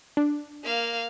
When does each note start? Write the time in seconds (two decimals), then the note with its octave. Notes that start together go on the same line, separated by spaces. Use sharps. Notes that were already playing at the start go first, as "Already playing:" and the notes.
0.17 D4
0.64 A#3 F5